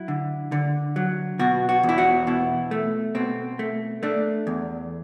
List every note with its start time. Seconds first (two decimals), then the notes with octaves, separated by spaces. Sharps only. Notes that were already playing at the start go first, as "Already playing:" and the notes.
Already playing: F#3 E4
0.08 D3
0.52 D3
0.96 F#3
1.39 B2 F#4
1.69 F#4
1.83 E2
1.89 E4
1.98 F#4
2.27 B2 E4
2.71 A3
3.15 B2 C4
3.59 A3
4.03 A3 D4
4.47 E2